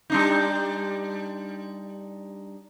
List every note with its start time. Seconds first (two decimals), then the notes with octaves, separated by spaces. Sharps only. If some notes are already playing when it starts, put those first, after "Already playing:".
0.10 G3 D4 D#4